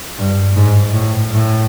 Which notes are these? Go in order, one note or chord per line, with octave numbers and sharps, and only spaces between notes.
G2
G#2
A2
A2